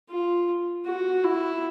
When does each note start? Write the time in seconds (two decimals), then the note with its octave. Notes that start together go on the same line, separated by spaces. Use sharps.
0.10 F4
0.86 F#4
1.24 E4